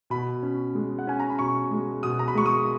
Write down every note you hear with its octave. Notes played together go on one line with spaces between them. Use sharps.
B2 B5
C#4
G#3
F#5
C#4 G#5
A#5
B5
B2 C#6
G#3
B2 D#6
A#5
B5
G#3 C#6
D#6